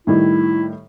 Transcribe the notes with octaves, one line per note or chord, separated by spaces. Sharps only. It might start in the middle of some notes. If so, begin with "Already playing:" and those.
A2 D#3 G3 E4